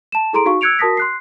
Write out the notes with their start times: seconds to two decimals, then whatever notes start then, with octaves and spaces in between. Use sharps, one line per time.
0.12 A5 E7
0.33 E4 G#4 A4 A#5 C6 D7
0.46 D#4 F#4 F5 C#6
0.61 E6 F#6 G#6 C#7 D7 F7
0.79 F#4 A#4 A5 D#6 A#6 B6
0.97 C6 F#6 C7